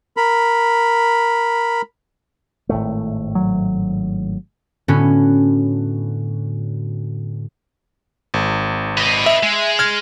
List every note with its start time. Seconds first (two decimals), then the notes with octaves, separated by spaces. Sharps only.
0.17 A#4 B5
2.69 G#1 A2 A3
3.35 F#3
4.88 A2 D3 B3 C#4 F#4
8.34 G#1
8.98 B4 D#5
9.26 E5
9.43 G#3
9.79 F6 G#6